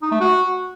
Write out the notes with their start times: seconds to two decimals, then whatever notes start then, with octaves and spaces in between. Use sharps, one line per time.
0.02 D#4
0.11 A3
0.20 F#4